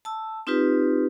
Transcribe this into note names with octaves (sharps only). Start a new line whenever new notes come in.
A5 E6
C4 D#4 F4 G4 B4